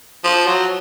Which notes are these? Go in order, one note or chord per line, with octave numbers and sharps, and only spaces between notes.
F3
F#3